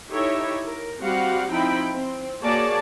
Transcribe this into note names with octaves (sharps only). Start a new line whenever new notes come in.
D#4 E4 G4 A4 C#5 E5
A#4
G3 C4 F#4 G4 F5 F#5
F3 C4 D#4 E4 G5 B5
C4
A#3 F#4 G#4 C#5 D5 A5